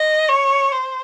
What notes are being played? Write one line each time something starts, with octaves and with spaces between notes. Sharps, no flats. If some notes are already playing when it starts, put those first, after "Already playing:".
Already playing: D#5
C#5
C5